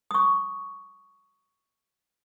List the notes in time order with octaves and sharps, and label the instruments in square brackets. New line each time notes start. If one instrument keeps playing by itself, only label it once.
[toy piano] C#6 D#6